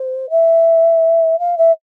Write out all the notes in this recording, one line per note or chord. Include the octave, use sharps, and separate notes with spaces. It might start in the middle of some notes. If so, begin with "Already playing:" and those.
Already playing: C5
E5
F5
E5